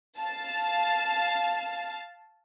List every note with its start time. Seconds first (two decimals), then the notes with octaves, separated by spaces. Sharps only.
0.20 F5 A5